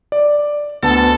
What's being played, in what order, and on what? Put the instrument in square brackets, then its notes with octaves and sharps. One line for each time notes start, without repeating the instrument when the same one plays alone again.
[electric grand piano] D5
[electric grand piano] D2 B3 A5 [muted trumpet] A4